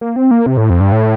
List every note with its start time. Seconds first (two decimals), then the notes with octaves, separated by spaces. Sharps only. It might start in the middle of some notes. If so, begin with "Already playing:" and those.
0.01 A#3
0.16 C4
0.31 A#3
0.46 C3
0.57 A2
0.70 F2
0.80 G2
0.92 A2